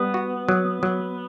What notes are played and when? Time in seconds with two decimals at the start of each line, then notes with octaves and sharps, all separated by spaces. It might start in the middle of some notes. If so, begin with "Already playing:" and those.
Already playing: G3 B3
0.14 F#4
0.49 F#3
0.83 F#3